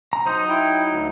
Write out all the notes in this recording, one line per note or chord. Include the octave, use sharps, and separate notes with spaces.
A#5
F#3 D#4 C5 D#6
E4 G5
D2